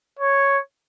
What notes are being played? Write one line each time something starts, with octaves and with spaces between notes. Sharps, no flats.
C#5